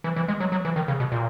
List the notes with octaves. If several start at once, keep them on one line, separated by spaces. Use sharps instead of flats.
E3
E3
G#3
F#3
F#3
E3
D#3
C#3
B2
A#2